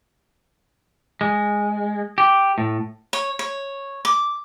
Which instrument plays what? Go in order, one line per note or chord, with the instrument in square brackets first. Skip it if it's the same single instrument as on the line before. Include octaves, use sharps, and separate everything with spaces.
[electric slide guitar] G#3
G4
A2
[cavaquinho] C#5
C#5
D6